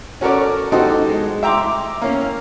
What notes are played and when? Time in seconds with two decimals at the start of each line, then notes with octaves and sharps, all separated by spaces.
0.21 C#4 F#4 A4 A#4 C#5 D5
0.72 D#4 F#4 G4 A4 C5 D#5
1.10 G#3
1.43 E5 G5 A#5 C6 D6
2.02 A#3 C#4